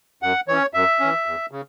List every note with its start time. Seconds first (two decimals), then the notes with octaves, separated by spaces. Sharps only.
0.22 F#2 F#5
0.48 E3 C#4 C#5
0.74 F#2 E5
1.00 E3 C#4
1.26 E2
1.51 C#3